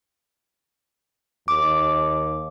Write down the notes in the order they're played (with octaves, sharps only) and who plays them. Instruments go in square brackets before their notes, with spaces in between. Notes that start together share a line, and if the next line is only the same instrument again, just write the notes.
[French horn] D#2 [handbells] D6